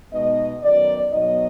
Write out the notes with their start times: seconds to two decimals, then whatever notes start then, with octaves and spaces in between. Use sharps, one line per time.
0.11 B2 G#3 B3 D#4 D#5
0.61 F#2 D#3 F#3 B3 D#4 D5
1.11 B2 F#3 B3 D#4 D#5